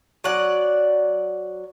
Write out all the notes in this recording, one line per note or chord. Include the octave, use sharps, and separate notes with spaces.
F#3 D5 F#5